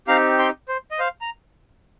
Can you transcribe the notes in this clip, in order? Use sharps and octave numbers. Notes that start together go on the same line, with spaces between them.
C4 D#4 G4 F5 A#5
G5 C6
C5
D#5
C5 F5
A#5